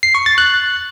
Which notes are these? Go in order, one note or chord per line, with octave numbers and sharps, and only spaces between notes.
C7
C#6
A6
F#6